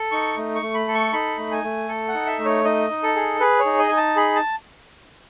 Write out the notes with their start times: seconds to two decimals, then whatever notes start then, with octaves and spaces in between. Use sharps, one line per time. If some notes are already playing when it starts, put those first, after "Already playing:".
Already playing: A4
0.12 D#4 C#6
0.38 A3
0.55 C#6
0.62 A3
0.74 B5
0.87 A4
0.95 C#6
1.13 D#4 B5
1.38 A3
1.51 G#5
1.64 A3
1.88 A4
2.08 F#5
2.14 D#4
2.26 E5
2.39 A3
2.45 C#5
2.65 D#4 D#5
2.90 D#4
3.03 A4
3.16 G#4
3.40 G#4 B4
3.59 C#5
3.66 D#4
3.79 D#5
3.89 D#4 G#5
3.97 A5
4.16 G#4 B5
4.36 A5